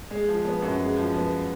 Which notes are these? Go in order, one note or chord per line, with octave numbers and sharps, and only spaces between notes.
G#3
F3
B3
F#2
G#3
F3
B3